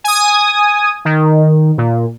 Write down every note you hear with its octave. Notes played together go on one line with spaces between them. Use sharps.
G#5 D#6
D#3
A#2